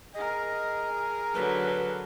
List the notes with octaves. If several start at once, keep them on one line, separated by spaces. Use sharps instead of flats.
G#4 A#4 D#5
D3 F#3 B4